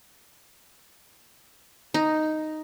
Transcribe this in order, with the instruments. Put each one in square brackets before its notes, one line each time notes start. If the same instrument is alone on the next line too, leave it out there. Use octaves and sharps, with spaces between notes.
[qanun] D#4